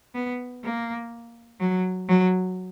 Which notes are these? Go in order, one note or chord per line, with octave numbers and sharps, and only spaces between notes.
B3
A#3
F#3
F#3